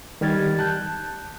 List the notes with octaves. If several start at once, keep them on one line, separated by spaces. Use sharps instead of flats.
D#3 G3 G4 F6 G#6 A6
A5 F#6 G6